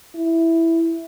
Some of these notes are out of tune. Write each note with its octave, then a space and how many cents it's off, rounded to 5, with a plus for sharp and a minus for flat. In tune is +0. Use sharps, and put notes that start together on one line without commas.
E4 +0